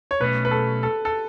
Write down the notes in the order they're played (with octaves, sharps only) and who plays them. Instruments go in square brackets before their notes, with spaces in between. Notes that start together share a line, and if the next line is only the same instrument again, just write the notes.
[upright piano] C#5
[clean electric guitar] B1 B2 A3 C#4 [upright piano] B4
[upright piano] B4
A4
A4
A4